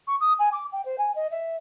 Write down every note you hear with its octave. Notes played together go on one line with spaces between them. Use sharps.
C#6
D#6
G#5
D6
G5
C5
G#5
D#5
E5